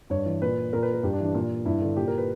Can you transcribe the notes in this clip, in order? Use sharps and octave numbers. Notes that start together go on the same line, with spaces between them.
G2 C#5
E3
A#2 B4
A#2 A#4
B4
A#4
G2 G4
D4
E3
D4
A#2
G2 E4
D3
A#2 G4
A#4
B4